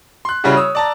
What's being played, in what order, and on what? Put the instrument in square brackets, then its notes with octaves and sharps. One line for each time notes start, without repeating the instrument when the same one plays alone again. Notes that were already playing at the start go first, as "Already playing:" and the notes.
[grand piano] C6 F#6
C#3 G3 C#4 E4 F#4 G#4
C#5 D#6 E6
D5 A5 A#5